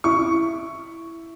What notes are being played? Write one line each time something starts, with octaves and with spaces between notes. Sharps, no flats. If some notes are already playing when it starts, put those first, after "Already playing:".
E4 C#6